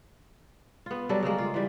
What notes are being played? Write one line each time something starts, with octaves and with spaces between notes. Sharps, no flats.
B3 F4
F#3 G3 D4 A4
C#3 G3 G#3 A#3
F4
E3 G3